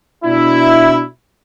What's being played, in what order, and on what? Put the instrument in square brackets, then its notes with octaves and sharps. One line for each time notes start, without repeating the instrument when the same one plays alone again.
[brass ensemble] B2 D4 E4